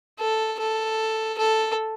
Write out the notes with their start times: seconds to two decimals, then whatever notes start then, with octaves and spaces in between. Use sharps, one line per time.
0.19 A4
0.60 A4
1.38 A4